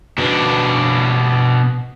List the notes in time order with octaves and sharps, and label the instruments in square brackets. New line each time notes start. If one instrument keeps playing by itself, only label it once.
[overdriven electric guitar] B2 D4